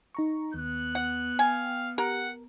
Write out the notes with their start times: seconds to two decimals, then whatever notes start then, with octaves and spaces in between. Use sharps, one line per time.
0.15 D#4 A#5 C#6
0.54 D#2 B3 F#6
0.95 F#5
1.39 F5 G5 G#5
1.98 G4 A#4 F#5